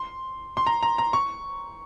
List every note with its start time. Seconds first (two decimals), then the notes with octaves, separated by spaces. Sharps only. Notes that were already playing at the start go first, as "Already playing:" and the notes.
Already playing: C6
0.57 C6
0.67 A#5
0.83 A#5
0.98 A#5
1.13 C#6